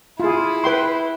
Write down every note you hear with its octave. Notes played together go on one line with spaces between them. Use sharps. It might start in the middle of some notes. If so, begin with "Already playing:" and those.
E4 F4 G#4
B4 G5 C6